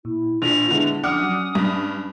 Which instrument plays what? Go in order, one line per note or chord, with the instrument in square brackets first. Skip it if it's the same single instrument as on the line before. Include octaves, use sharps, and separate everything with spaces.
[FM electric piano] A#2 [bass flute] E4
[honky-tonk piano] A#1 [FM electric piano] D4 B6 [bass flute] F4 [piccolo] F7
[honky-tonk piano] D3 [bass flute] G#3 [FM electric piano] B3 D4 E4
[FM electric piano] F3 D4 [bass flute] C#4 [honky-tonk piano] F#5 D6 F6 [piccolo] D#6
[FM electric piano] F#3
[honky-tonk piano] G2 [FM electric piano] B5